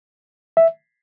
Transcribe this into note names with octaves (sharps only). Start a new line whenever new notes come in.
E5